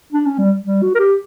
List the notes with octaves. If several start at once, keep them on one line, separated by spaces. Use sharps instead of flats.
D4
C#4
G3
G3
F#4
A#4
G4